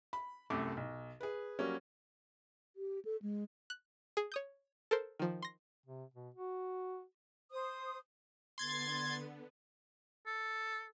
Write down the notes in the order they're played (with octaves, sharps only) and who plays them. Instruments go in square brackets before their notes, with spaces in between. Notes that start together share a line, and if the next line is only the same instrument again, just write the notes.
[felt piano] B5
C2 F#2 A3 D6
B1
G#4 B4
F#3 G3 A#3 C#4
[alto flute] G4
A4
G#3
[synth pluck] F#6
G#4
C#5 D#6 G6
A4 A#4 C5
D#3 F3
C6 A#6
[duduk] C3
B2
F#4
[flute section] C5 D#6
[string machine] D3 B3 [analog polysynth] C6 G#6 A6
[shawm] A4